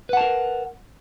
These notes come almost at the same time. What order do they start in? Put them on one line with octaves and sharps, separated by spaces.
B4 F#5 A5 A#4